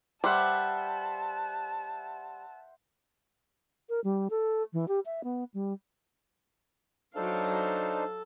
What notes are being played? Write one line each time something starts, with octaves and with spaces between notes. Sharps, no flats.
G3 C5 E5 F#5 A5
A#4
G3
A4
E3
G4
E5
B3
G3
F#3 D4 D#4 A4 C5 F5